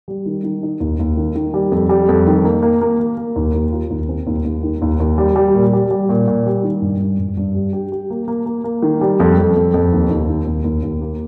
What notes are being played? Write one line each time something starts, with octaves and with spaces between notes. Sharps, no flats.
G3
D#3
D#3
D#4
D#2
D#2
D#3
D#3
G3
F2
G3
F2
D#3
A#3
A#3
A#3
A#3
A#3
D#2
D#2
F4
D#2
C4
D#2
D#2
D#3
D#2
D#2
G3
G3
A#2
G3
G3
A#2
A#2
G3
D#3
G2
G2
G2
G2
G3
G4
G4
A#3
A#3
A#3
A#3
D#3
G3
F2
F2
F2
F2
D#2
D#2
D#3
D#2
D#2
D#2
A#3